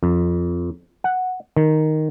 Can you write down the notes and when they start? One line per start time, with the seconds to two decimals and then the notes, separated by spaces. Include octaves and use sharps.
0.03 F2
1.04 F#5
1.56 D#3